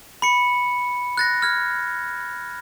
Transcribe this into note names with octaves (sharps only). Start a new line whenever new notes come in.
B5 C#7
F#6 A6 A#6
F6 G#6